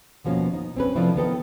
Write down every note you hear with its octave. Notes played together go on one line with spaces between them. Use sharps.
D#2 B2 F3 A#3 C#4
D#4
C4 C#4 B4
C3 F3 A3 C4 D4 E4
D#3 B3 A4 G5